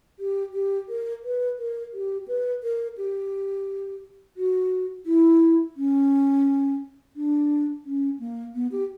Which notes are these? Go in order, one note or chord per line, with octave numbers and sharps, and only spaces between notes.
G4
G4
A#4
B4
A#4
G4
B4
A#4
G4
F#4
E4
C#4
D4
C#4
A#3
B3
G4